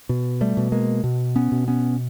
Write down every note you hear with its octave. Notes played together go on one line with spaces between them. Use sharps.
B2
G3 A3
B2
G#3 A#3
B2
B3 C#4
B2
B3 C#4